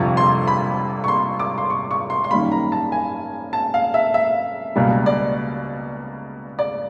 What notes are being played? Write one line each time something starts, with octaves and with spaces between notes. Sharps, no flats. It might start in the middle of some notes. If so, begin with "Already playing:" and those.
Already playing: G1 F2 C3 F3 C#6
C6
B5
C#6
C6
D6
C6
C#6
C#6
C6
C6
F#2 D#3 G3 A#3 B5
A#5
A5
G#5
A5
F5
E5
E5
C#2 B2 G3 A#3
D5
D5